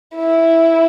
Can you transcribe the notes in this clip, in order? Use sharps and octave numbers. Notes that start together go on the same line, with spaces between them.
E4